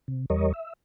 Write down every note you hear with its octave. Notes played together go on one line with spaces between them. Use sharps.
C3
E2 G3 A#4 C#5 D#5
E5